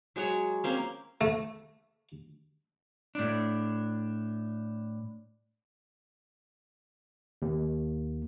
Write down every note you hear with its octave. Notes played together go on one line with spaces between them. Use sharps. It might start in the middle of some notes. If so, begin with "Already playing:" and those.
F#3 G#3 F#4 C#5
A#3 C4 C#4
A3
A2 D4
D#2